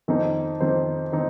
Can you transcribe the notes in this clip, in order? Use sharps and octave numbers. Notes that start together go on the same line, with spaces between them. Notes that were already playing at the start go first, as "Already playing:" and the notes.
F2 D#3 C4 D#4 C5
F2 D#3 C4 D#4 C5
D#3 C4 D#4 C5